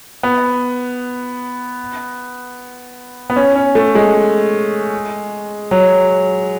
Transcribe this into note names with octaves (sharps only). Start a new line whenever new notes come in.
B3
B3
C#4
C#4
A3
G#3
F#3